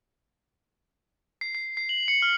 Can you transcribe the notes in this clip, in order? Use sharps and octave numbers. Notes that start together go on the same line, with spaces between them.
C7
C7
C7
F#7
C#7
F6